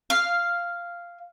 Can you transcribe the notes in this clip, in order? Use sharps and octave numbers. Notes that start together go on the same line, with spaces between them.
F5